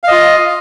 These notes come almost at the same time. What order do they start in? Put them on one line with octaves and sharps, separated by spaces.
F5 D#5 F4